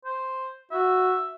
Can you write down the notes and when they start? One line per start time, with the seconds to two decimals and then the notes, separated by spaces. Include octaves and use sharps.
0.05 C5
0.72 F#4 E5